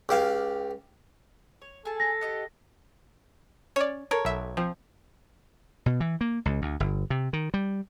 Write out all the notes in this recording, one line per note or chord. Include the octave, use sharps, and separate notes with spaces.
C#2 G4 F5
C#5
G#4 A4 A5
A#6
G4 D#5 F#5
C#4 C#5 D5
A4 A#4 C#5
B1 E5
F3 C4
B2
E3
A#3
C#2
D2
G1
C3
D#3
G3